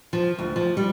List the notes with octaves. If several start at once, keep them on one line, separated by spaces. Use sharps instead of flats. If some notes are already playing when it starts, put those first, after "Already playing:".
F3
D2
F3
G3